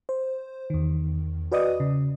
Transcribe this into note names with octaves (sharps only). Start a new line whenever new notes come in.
C5
E2 D#3
F#4 B4 D5 D#5 D#6
C#3